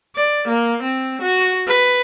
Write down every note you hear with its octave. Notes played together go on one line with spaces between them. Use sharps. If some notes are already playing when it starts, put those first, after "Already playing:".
D5
A#3
C4
F#4
B4